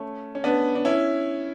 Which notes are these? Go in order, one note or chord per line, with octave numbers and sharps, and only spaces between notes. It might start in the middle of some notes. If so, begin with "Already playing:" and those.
Already playing: A3 C#4
C#4
B3 D4
D4
C#4 E4